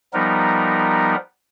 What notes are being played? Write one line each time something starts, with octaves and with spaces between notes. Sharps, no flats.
F3 G3 B3 D#4 A#4